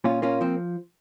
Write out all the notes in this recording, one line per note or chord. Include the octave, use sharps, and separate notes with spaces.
A#2 C#4 F4
A#3 C#4 F4
F3 C4